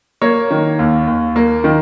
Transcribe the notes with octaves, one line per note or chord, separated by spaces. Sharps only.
A#3 C#5
D#3
D#2
D#2
A#3
D#3